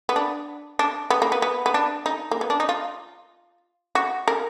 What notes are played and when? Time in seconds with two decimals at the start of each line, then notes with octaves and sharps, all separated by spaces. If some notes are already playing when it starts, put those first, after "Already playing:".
0.09 B3
0.16 D4
0.79 D4
1.10 B3
1.22 A#3
1.32 B3
1.42 B3
1.66 B3
1.74 D4
2.06 D#4
2.31 A#3
2.41 B3
2.50 D4
2.60 D#4
2.69 F4
3.95 F#4
4.28 A#4